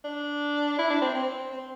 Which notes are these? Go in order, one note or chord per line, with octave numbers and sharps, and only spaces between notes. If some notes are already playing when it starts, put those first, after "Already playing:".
D4
E4
D4
C4
C4
C4